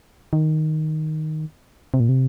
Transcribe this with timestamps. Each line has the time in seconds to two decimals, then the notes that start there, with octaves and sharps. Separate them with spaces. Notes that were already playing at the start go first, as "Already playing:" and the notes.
0.33 D#3
1.94 C3
2.00 A#2
2.09 C3